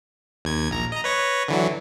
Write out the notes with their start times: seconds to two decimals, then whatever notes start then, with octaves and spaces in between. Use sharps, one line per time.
0.45 D#2 G#6
0.70 A#1 A#5
0.92 D#5 A#5
1.04 B4 C#5 A#6
1.48 D3 E3 F#3